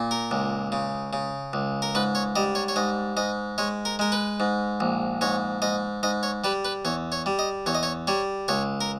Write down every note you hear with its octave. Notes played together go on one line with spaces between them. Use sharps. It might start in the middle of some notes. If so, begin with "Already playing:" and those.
Already playing: A#2
A#4
C#2
C#3
C#3
C#2
A#4
G#2 B4
C#5
G3 D#5
C#5
C#5
G#2 D#5
G#2 D#5
G#3 C#5
A#4
G#3 A#4
B4
G#2
A#1
G#2 C#5
G#2 D#5
G#2 D#5
C#5
G3 B4
B4
E2 C#5
C#5
G3
D#5
E2 C#5
D#5
C#5
G3 C#5
C#2 C#5
A#4